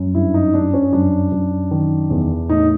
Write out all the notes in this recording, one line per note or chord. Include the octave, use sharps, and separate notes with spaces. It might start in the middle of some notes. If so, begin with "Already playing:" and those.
Already playing: F#2
G2 E4
D#4
G2 D4
C#4
F#2 D4
F#2
D#3
E2
A2 D#4